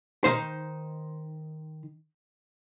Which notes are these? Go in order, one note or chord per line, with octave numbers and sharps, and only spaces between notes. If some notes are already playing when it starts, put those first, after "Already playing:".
D#3 D#4 C5